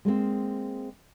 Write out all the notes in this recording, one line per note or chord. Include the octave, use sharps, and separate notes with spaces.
G#3 A#3 C4